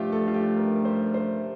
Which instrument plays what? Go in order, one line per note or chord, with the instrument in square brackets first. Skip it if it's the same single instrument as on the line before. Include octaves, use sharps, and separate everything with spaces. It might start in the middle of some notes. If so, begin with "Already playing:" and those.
Already playing: [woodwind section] G2 F3 A3 [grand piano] F4 G4
[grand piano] A4
F4
G4
A#4
A#4
C5
C5